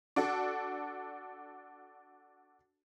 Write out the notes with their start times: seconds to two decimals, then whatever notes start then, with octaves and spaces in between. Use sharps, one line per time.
0.16 D4 F#4 A4